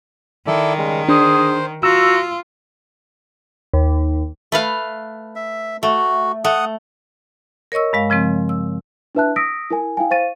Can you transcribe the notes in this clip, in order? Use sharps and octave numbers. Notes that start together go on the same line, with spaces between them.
D#3 E4 A4 D5
C#3 G3 G#3
D4 G#4 C5
F4 F#4 A#5 E6
D#2
A3 B4 F5
E5
A3 F#4
A3 F#5 D#6
A#4 C#5 D#5 C#6 E6
G2 G#3 F5
C#3 F3 G#3 C4
E6
D4 E4 B4 E5 A5 F#6
D#6 E6 A#6 B6 D7
E4 A#4 G#5
E4 F5 G5 G#5
C5 F5 C#6 A6 D#7